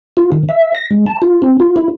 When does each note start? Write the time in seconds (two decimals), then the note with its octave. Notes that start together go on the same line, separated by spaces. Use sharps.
0.17 F4
0.32 D#3
0.49 E5
0.75 A#6
0.91 G#3
1.06 A5
1.22 F4
1.42 C4
1.60 F4
1.76 E4